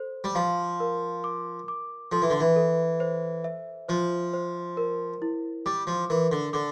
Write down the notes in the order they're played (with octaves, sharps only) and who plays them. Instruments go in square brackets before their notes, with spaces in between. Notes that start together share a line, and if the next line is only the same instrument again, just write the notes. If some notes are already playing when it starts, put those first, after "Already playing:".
Already playing: [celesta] A4 C5
[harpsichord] G3
[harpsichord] F3 [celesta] F5
[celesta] A#4
D6
D6
[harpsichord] F3 [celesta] A4
[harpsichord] E3
D3
E3
[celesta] A4
C5
E5
[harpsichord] F3 [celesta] C5
[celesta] C5
A#4
E4
[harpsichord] G3 [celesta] D6
[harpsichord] F3
[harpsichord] E3 [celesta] A#4
[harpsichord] D3
[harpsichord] D3 [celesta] D6